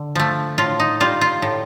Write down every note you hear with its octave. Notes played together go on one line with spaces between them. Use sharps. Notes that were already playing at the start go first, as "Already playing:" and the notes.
Already playing: D3
F3 A3
A2 F4
D#4
G3 F4
F4
A2